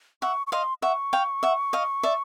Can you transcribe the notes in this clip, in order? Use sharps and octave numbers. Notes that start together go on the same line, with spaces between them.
E5 F#5 C#6
C#6
D#5 F5 C6
E5 F#5 C#6
F5 G5
E5 F#5
D#5 F5
D5 E5